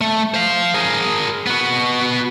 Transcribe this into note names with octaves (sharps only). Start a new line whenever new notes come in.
A3
C5 F5
G#4 A#4
B3 F#4